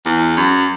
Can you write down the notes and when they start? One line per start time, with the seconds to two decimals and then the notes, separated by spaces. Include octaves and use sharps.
0.06 E2
0.37 F#2